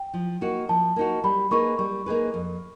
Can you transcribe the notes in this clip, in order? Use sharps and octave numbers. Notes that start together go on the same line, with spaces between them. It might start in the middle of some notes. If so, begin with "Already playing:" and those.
Already playing: G5
F3
A#3 D#4 F#4
F3 A5
A#3 D#4 F#4
G3 B5
A#3 D#4 G#4 B4 C#6
G3 C#6
A#3 D#4 G#4 B4
F2